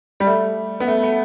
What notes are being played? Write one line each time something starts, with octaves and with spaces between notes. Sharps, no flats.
G3
A3
B3
A3
A3